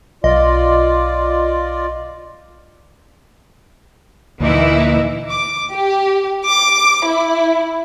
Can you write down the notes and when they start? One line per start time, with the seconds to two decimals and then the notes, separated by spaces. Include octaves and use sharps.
0.24 B1 F4 D5 D#5
4.40 D2 A#2 E3 D#4 E4
5.30 D6
5.72 G4
6.45 D6
7.05 E4